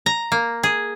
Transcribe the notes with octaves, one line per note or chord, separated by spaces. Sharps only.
A#5
A#3
G#4